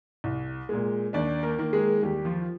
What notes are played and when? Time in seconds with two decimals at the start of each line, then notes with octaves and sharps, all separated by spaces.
0.24 C2
0.69 A#2 G#3
1.13 D#2 D4 D5
1.43 A#3 A#4
1.58 D#3 A#3
1.73 G#3 G#4
2.03 D#2 G3 G4
2.25 F3 F4